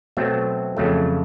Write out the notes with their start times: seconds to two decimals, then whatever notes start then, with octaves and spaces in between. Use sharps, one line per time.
0.17 B2 F#3 A3 C4 E5
0.77 F2 C#3 F#3 A3